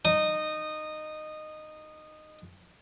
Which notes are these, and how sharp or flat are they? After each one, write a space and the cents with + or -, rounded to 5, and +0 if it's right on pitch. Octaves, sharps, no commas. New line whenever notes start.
D#4 -15